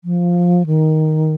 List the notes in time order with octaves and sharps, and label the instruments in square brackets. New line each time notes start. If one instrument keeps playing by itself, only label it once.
[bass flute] F3
D#3